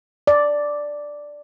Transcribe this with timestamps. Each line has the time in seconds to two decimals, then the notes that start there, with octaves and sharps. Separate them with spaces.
0.27 D5